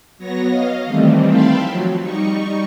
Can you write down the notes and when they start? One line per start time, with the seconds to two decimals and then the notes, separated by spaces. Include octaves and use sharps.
0.18 F#3 B3 C#5 A#6
0.49 D#5 F5
0.86 D#3 E3 G3 A3 C4
1.27 E5 F5 G5 A5 B5 C6
1.57 F3 F#3
1.99 G3 D#4 C#6